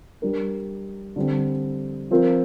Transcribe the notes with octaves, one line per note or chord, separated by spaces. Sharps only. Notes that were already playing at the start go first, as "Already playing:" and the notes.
G3 D4 A#4
D3 G3 C4
F3 C4 F4 A#4